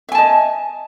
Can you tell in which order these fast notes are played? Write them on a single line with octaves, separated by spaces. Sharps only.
E5 G#5 A5 D#5